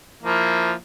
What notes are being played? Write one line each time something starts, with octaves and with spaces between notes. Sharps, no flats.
F3 A#3 E4